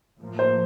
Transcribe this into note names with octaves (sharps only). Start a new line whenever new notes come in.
A2 F3 A#3
C5